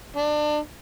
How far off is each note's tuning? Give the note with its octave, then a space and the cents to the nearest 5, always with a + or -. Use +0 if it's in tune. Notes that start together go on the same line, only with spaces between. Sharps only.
D4 +30